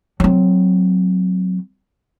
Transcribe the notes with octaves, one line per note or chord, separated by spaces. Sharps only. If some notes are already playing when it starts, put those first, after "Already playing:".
F#3 C4